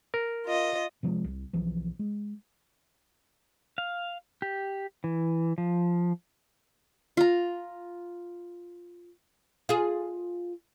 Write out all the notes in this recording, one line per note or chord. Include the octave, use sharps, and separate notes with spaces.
A#4
F4 D#5
C3 F3 G3 G#3
C2
B1 E3 F3
G#3
F5
G4
E3
F3
F4 A#5
F4 G#4